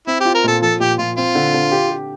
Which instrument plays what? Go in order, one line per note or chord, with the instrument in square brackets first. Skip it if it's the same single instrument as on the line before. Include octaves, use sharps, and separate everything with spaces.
[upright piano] C4 [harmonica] E4
[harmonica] G4
[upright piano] F4
[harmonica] A#4
[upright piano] A#2 [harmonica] A4
[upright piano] F3 [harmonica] A4
[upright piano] A#2 [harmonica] G4
[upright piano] A#2 [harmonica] F4
[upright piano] C4 [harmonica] F4
[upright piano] D3
D3
G4
G4